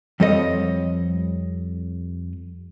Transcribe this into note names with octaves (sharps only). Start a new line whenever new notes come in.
F2 F3 G3 A4 C#5 D#5